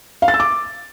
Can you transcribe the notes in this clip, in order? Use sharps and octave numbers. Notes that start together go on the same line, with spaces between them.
F5
A6
E6
D6